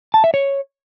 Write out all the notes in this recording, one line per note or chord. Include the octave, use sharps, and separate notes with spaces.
A5
E5
C#5